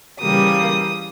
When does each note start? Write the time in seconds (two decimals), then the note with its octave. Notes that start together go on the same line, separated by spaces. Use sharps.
0.20 C#3 E3 G3 A#3 D#6